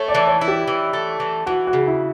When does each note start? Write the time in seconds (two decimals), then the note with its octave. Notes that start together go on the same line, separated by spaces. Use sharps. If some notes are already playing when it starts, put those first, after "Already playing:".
Already playing: A3 C#5
0.08 D5
0.15 E3
0.27 C#5
0.41 E4
0.48 G4
0.68 E3
0.93 A3
1.20 E3
1.46 E3 F#4
1.67 F#4
1.73 C#3
1.87 E4